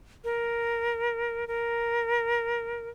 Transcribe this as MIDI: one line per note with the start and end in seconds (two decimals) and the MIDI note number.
0.24 1.47 70
1.48 2.89 70